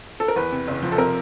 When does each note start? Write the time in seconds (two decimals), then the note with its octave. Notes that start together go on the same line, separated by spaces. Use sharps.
0.20 A4
0.28 A#4
0.36 E2 B4
0.52 C3
0.68 F#1
0.82 F3
0.92 A4
0.98 C3 A#4